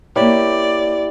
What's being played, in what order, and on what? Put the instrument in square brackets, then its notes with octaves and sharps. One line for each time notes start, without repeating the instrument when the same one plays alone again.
[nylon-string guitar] A#3 C#5 [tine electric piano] E4 G4 [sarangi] D5